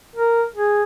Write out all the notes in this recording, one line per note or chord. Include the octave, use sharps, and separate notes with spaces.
A#4
G#4